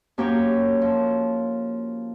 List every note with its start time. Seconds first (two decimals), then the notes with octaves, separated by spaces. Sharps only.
0.18 F#2 A#3 G4 C#5
0.81 F3